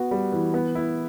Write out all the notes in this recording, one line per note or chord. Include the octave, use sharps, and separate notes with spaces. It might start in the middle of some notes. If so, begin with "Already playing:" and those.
Already playing: B3 F#4
G3
E3
B3
E4